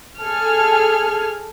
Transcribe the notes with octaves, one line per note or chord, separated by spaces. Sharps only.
G#4 A4 G#5 F6